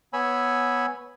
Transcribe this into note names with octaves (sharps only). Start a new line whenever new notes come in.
B3 C#5 G#5 B5 E6